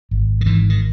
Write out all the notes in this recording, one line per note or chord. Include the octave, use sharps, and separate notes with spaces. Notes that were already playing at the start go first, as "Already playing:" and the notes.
G#1
D#3
G#2 E3
D#3